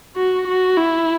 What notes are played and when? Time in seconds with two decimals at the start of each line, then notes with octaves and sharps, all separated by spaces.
0.16 F#4
0.48 F#4
0.77 E4